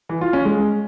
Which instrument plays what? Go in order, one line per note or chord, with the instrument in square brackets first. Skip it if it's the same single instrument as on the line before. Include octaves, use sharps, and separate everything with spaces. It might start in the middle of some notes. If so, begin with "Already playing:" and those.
[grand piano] E3
F4
C#4
G#3